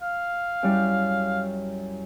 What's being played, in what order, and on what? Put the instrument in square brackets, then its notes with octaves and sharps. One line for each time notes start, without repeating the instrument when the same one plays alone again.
[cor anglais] F5
[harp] F#2 G3 E4